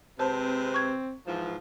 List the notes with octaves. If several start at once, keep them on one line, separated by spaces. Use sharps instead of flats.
C3 G#3 C4 B4 C5 A5
C#6 G#6
G#2 E3 F3